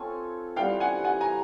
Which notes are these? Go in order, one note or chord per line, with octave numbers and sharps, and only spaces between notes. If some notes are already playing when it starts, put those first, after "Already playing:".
Already playing: C4 F4 A4 C#5 G#5
E3 G3 B3 F5 G5
F#5 G#5
F#5 G#5
G#5 A#5